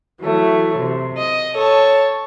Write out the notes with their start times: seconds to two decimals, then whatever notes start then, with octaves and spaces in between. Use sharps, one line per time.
0.20 E3 F#3 A3
0.78 C3
1.17 D#5
1.53 A4 C#5 A5